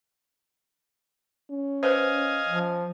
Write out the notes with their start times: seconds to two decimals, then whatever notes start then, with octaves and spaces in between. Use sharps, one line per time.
1.51 C#4
1.83 B4 C5 D#5 F5 G#5
2.48 F3